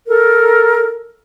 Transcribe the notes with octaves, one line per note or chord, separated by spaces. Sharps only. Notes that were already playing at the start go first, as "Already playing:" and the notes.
A4 A#4